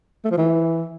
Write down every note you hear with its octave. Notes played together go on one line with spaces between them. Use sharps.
A3
F3
E3